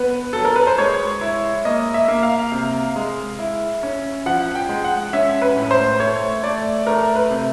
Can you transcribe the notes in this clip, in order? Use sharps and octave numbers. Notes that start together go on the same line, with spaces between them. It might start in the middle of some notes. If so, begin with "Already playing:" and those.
Already playing: B3 B4
F#3 A4
A#4
B4
C5
G#3 C#5
E4
A#3 D#5
E5
A#3
F5
C3
G#3
E4
C#4
F3 F#5
G5
G#3
F#5
C#4 E5
B4
A2
C5
A3 C#5
A3 D5
A3 A#4
B4
C3